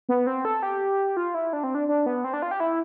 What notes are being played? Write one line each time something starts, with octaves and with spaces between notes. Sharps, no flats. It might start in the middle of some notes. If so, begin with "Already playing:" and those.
B3
C4
A4
G4
F4
E4
D4
C4
D4
D4
B3
C4
D4
F4
G4
E4